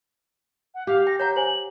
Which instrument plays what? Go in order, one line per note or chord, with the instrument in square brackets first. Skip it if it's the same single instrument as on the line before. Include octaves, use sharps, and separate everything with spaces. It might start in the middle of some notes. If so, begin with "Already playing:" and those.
[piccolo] F#5
[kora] G4 [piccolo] F5
[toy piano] G5 [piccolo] A#6
[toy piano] C#5 F#5 A#5 [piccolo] G6
[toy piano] C5 G#5 [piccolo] F#7